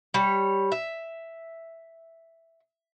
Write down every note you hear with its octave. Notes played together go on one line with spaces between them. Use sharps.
G3 C#5
E5